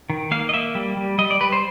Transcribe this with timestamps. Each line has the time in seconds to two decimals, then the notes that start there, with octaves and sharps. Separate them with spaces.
0.10 D#3
0.31 A#3 F5
0.49 D#5
0.54 A#3 E5
0.75 G3
0.97 G3
1.18 G3 D#5
1.31 D5
1.41 G3 B4
1.52 C5